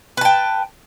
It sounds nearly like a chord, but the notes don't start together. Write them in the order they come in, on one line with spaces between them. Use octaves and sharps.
B4 A5 G5